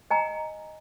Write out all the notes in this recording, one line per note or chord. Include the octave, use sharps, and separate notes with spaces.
D#5 G#5 A#5